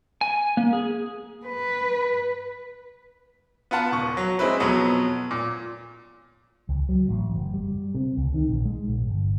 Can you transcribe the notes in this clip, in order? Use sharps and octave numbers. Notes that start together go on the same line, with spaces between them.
G#5
A#3
G#4
B4
B3 F4 F#5 A5
D#1 C#6
F#3
G#3 C4 E4 B4
F2 B2 F#3 B3
A#2
C#2
F#3
A1
F#1
G3
C3
C#2
D#3
A#1
G#3
A#1
G1